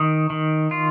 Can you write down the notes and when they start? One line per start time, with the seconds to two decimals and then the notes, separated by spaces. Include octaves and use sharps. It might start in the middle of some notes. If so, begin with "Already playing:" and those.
Already playing: D#3 D#6
0.30 D#3
0.71 F4